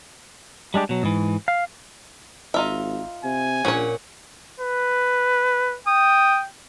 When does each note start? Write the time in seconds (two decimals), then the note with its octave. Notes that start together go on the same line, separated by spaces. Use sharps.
0.74 G3 G#3 D4 G4
0.89 B2 F#3
1.03 G#2 E3
1.48 F5
2.54 G#1 D#4 F4 E5
3.24 C3 G#5
3.65 A#1 A#2 C#4 C#5 F#5
4.60 B4
5.87 G5 D#6